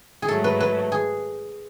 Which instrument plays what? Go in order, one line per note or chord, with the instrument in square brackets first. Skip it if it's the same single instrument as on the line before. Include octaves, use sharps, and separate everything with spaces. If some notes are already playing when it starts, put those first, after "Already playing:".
[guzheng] G#4
[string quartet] G#2 F#3 A3 [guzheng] A4
[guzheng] B4
B4
G#4